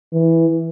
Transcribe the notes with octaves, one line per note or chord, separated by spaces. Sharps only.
E3